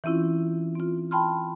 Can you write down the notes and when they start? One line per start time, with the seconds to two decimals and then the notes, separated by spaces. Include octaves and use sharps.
0.04 E3 C4 C#4 E4 F4
0.76 C4 F4
1.11 G5 A5 B5 C6 F6